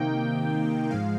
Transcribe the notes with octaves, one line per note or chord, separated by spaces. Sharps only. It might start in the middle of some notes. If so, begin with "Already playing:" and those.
Already playing: C3 D#3 A#3 D#4 G5
G#2 F3 G#3 F5